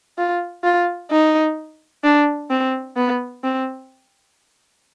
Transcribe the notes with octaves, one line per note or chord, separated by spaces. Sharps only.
F4
F4
D#4
D4
C4
B3
C4